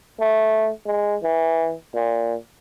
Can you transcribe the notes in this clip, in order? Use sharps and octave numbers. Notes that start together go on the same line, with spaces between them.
A3
G#3
E3
A#2